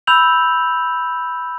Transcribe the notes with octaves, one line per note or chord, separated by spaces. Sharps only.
B5 E6 G6 F7 F#7